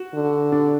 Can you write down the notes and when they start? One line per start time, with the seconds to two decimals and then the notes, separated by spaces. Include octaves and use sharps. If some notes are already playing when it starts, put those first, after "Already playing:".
Already playing: F#4
0.14 D3
0.52 D4